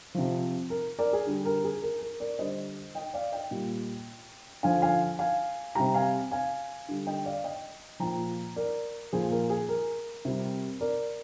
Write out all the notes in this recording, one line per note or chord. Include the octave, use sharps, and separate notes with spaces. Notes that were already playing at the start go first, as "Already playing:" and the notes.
C3 F3
A#4
A#4 D5
G#4
D3 G3
A#4
G#4
A#4
A#4
A#4 D5
D3 G3 C5 D#5
D#5 G5
D5 F5
D#5 G5
A#2 G3
D3 F3 F5 G#5
F5 G#5
F5 G#5
C3 G3 G5 A#5
F5 G#5
F5 G#5
D3 G3
D#5 G5
D5 F5
D#5 G5
A#2 F3 G5 A#5
A#4 D5
A#2 F3 G#4 C5
A#4
G#4
A#4
C3 G3
A#4 D5